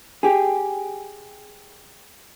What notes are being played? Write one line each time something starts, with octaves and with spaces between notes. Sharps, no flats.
G4 G#4